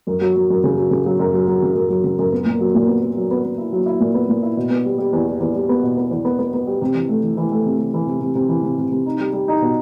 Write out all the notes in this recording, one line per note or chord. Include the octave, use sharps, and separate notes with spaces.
F#2
F#3
F#3
F#2
C#3
F#3
C#3
F#3
F#2
F#3
F#3
C#3
F#2
F#3
C#3
F#2
B3
A#2
F#3
A#2
B3
B3
F#3
B3
B3
E4
F#3
E4
A#2
B3
A#2
E4
B2
B3
G3
G3
E2
G3
E2
G3
B3
B2
B3
E2
B3
B3
B3
G3
C3
E3
A3
E3
E3
A3
C3
C3
E3
C3
C3
C3
E3
C3
C3
C3
D#4
G3
G3
D#4
B2